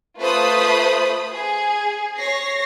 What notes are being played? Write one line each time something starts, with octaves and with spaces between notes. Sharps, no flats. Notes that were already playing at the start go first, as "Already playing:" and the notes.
A3 F4 B4 C5 B5 D#6
G#4
C#5 A#6 C7